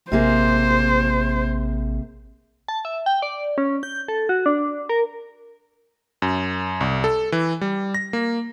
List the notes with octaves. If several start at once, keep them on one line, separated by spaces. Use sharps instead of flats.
A1 C3 A#3 G#4 C5
A5
E5
G5
D5
C#4
G6
A4
F#4
D4
A#4
F#2
C2
A4
E3
G3
A#6
A#3